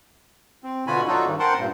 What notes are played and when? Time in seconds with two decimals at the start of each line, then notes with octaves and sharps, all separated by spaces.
0.63 C4
0.87 B2 D3 F4 F#4 G#5 B5
1.08 F#3 D4 D#4 F4 F#4 A4
1.26 G2 D#3
1.40 A#4 C5 F#5 G5 A5 C6
1.59 G2 A#2